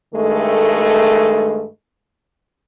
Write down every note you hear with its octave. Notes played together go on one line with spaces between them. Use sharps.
G2 D#3 G#3 A3